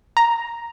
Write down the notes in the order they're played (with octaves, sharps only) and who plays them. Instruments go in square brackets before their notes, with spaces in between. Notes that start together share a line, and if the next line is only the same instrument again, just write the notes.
[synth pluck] A#5